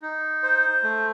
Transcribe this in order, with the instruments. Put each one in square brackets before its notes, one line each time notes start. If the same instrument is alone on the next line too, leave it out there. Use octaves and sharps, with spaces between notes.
[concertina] D#4
C5
A3